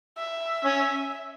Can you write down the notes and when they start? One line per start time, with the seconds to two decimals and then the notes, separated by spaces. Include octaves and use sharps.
0.17 E5
0.65 C#4